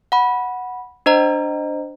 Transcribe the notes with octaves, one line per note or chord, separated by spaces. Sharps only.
F#5 B5
D4 C5 D#5 A#5